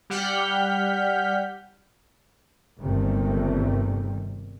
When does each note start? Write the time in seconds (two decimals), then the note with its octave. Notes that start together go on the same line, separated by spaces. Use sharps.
0.10 G3 G4 F#5 F6 G6 B6
2.80 G1 G#2 C3 D#3 G3 A3